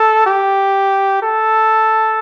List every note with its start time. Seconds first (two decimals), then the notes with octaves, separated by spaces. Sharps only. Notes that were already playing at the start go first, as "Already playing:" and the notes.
Already playing: A4
0.26 G4
1.22 A4